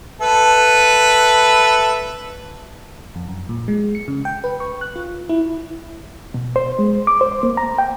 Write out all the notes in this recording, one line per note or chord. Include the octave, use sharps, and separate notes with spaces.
A4 B4 E5
F2
F#2
A#2
G#3
C#7
C#3
G5
B4
C#6
F#6
F4
E4
B2
C5
G#3
D6
C5
A#3
A#5
G5